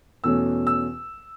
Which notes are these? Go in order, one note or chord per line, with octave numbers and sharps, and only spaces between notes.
E2 B2 A3 C#4 E6
E6